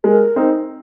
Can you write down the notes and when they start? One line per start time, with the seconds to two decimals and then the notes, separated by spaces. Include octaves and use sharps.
0.04 G#3 A#4
0.36 C4 D#4